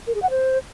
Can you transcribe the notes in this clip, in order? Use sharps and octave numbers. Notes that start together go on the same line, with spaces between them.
A#4
G#4
F#5
C5